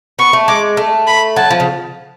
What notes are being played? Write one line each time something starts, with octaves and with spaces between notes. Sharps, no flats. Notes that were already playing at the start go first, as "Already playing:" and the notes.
B3 C#6
A3
G#3 D6
A3
B5
F#3 A5
F3
C#3